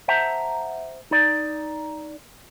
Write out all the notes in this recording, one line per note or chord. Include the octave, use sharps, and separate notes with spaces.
C5 E5 F#5 A5 A#5
D#4 D5